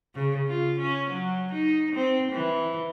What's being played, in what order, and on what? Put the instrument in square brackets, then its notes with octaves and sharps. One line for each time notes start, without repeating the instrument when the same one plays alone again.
[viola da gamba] C#3
F4
C#4
F#3
D#4
C4
E3